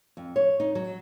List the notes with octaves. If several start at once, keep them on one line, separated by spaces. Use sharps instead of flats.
F2
C#5
D#4
F#3